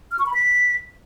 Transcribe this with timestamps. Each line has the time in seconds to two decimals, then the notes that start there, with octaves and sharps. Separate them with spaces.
0.11 F6
0.19 C#6
0.26 B5
0.34 B6